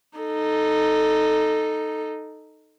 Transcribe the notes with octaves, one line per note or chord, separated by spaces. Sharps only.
D#4 A4